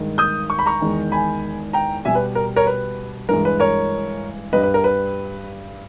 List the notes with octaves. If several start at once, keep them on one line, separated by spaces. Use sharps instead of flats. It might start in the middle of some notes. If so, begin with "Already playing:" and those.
Already playing: G2 D#3 G#3
D#6 G6
C#6
B5
A#5 C#6
E2 D#3 G#3
G#5 B5
G5 A#5
B2 G3 E5 G#5
B4
A#4
A#4 C#5
B4
G2 E3 G#3 A#4
B4
A#4 C#5
G2 G3 B4 D#5
B4
A#4
B4